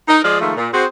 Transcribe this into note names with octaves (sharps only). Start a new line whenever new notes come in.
D#4 A#4 D#5
F3 G#3 G#4 D5 D#5 F5
D#3 F3 G#3 A3
A#2
C4 F#4 G#4 C5